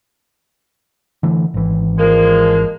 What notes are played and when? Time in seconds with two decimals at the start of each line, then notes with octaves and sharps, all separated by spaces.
1.23 D3 E3 A3
1.54 G#1 E3
1.98 F3 G#3 A#3